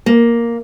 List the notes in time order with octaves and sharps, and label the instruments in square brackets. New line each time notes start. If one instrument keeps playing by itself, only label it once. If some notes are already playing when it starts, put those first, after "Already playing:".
[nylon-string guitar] A#3